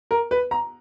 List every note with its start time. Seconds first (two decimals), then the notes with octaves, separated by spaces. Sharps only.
0.11 A#4
0.31 B4
0.51 A#5